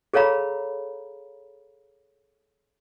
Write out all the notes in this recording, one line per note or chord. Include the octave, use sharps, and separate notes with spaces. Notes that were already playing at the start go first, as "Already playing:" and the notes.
G#4 A4 C#5 F5 A#5 B5